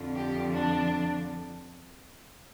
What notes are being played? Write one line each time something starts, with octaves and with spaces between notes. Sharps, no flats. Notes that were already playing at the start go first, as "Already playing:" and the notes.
Already playing: F2 D3 F3
G4
D4